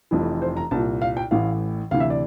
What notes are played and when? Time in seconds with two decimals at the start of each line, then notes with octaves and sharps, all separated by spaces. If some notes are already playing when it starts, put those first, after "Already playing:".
0.11 F1 F2 E3
0.42 C5
0.57 A#5
0.71 C2 A#2 A5
1.02 F5
1.17 G5
1.31 A1 A2 E3 F5
1.91 D2 C3 E3 F5
2.00 E5
2.10 D5